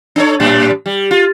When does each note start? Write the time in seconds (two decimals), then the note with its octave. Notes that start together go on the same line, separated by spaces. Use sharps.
0.16 D4 A4 C#5
0.40 A2 G3 D4
0.86 G3
1.11 F4